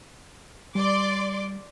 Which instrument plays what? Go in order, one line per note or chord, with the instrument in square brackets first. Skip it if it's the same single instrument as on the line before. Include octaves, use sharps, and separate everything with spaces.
[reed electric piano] G3 [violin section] D5 C6 D6